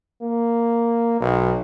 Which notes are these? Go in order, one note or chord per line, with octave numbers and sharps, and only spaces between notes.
A#3
B1